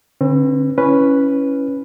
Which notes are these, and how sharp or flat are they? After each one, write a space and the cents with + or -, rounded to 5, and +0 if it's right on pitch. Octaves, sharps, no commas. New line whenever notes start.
D3 +0 C4 +45 B4 +0
C#4 +0 E4 +0 B4 +0